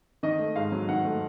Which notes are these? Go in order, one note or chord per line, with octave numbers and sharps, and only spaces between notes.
D#3 D#5
A3
G#2 F5
F#3
D#3 F#5
A3